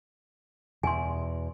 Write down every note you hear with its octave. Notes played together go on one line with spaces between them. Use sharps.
E2 B2 G#5 C6